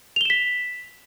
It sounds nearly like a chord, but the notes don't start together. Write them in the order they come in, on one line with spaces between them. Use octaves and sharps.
F7 G7 E7 B6